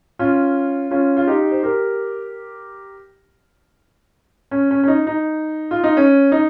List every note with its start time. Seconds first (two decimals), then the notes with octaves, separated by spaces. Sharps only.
0.19 C#4 F4
0.91 C#4 F4
1.17 F4
1.27 D#4 G4
1.51 C5
1.63 G4 A#4
4.51 C#4
4.71 C#4
4.83 C#4
4.88 D#4
5.07 D#4
5.71 F4
5.84 D#4
5.97 C#4
6.32 D#4